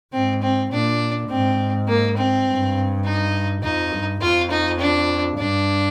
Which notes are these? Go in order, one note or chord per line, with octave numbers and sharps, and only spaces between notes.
G#2 C4
C4
A#2 D4
G#2 C4
A#3
C4
G2
D#4
F2 D#4
G2
F2 F4
D#4
D4
G2 D4